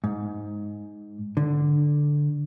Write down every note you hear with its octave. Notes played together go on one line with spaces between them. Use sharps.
G#2
D3